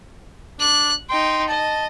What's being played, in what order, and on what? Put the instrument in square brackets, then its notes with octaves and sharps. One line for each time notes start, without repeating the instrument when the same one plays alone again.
[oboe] D4 [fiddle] F#6
[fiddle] D#4 G5 [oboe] C6
[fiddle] D#5 [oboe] A5